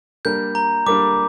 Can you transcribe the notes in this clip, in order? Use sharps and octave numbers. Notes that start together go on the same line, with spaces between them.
G3 A#3 D4 A#4 G6
A#5
G3 A#3 D4 A#4 D6